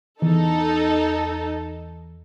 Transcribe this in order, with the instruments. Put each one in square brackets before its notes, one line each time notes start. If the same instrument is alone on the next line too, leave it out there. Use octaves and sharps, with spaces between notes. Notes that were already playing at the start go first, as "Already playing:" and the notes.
[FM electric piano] E2 [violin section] D#4 A4